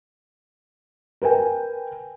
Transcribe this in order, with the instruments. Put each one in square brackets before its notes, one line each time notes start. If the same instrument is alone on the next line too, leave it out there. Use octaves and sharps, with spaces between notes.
[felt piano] A#4 B4 G5 G#5